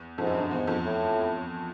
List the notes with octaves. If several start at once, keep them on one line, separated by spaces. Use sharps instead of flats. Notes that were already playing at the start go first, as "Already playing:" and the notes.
Already playing: E2
F2 G#2
F#2
G2
F#2
E2 G#2
F2
A2